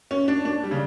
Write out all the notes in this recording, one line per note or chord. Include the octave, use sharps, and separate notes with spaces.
C#4
D4
D4
G3
C#3